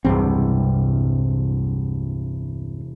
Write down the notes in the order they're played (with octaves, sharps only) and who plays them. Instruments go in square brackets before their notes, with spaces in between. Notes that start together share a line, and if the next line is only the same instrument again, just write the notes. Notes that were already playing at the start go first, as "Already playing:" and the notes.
[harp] E1 C3 [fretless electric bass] C2 G2 C4